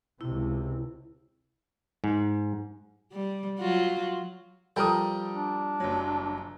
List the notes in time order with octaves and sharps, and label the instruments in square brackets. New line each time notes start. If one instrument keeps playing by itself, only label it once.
[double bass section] C#2 C3 [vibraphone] E4
[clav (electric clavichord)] G#2
[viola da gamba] G3
F#3 F4 F#4
[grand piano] F3 A#4 D#6 [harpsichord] G3 [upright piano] A4 G5
[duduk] D4
[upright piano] F#1 F#3